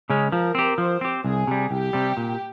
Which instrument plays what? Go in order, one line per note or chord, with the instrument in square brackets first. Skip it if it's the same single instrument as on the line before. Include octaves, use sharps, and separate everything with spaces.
[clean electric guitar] C#3 G#3 C#4
[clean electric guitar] F3 [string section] A#4
[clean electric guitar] C4 G4
[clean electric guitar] F3 [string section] C5
[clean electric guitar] C4 G4
[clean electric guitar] C2 [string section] G#4
[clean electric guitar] C3 G3
[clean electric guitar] C2 [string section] G4
[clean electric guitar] C3 G3
A#2